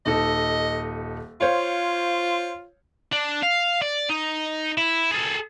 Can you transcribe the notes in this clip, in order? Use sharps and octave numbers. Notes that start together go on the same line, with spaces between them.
D#1 D#4 A4 D#5
F4 C5 C#5 F5
D4
F5
D5
D#4
E4
G#4 A4